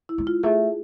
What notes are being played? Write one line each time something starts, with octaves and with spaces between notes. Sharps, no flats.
E4
G#3
F4
A3 G#4